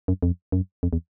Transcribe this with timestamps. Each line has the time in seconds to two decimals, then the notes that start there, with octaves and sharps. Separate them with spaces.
0.08 F#2
0.23 F2
0.52 F#2
0.83 F2
0.93 E2